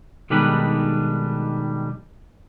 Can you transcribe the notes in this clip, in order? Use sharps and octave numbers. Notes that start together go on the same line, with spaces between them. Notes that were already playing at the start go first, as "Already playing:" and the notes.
B1 D#3 G3 G#3 D4 B4